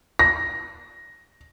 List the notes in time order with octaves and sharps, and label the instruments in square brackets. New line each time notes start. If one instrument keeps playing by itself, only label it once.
[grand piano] A#6